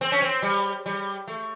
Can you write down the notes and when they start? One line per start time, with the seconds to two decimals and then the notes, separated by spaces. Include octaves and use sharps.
0.01 C4
0.12 C#4
0.22 C4
0.42 G3
0.86 G3
1.28 A3